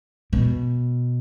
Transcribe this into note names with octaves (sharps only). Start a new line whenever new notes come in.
B2